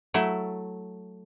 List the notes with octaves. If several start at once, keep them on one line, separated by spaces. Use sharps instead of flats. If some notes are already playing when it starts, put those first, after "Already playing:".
F#3 A3 E4